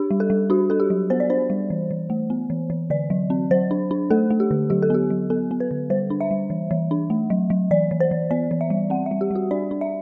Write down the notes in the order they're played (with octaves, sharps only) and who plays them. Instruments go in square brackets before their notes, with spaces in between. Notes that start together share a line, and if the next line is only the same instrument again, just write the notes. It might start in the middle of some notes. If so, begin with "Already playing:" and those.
Already playing: [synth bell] D4 G4
G3
A4
G3
D4 F#4
D4 A4
G4
F#3
B3 C5
D5
D4 C5
G3
E3
E3
A3
B3
E3
E3
D3 D5
F#3
C4
F#3 C5
D4
D4
A3 A4
A3
G4
D3
F#3 G4
A4
B3 G4
F#3
B3 A4
B3
B4
D3
G3 C5
D4
E5
G3
E3
E3
D4
A3
F#3
F#3
E3 D5
E3
C5
E3
B3 D5
E3
E5
G3
C4 F#5
E5
G3
G4
G3 F#4
D4 D5
D4
E5